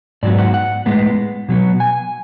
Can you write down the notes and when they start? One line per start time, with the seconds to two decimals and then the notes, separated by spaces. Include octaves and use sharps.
0.23 G#2 F#3 B3 D5
0.39 F#5
0.54 F#5
0.86 A2 G#3 B3
1.49 B2 F#3 B3
1.80 G#5